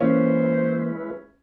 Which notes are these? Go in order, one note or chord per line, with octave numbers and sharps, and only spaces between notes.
E3 G#3 A#3 C#4 E4 B4 C5